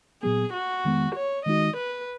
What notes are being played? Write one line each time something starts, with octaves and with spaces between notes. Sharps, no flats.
A#2 F#3 B3 G#4
F#4
F2 D#3 G#3 B3
C#5
D#3 G#3 D#4 F#4 D#5
B4